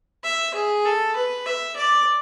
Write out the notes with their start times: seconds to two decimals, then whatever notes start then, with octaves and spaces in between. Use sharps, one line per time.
0.24 E5
0.55 G#4
0.85 A4
1.16 B4
1.46 E5
1.77 D5